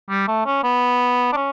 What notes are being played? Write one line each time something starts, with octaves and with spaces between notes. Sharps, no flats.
G3
A3
C#4
B3
D4
C#4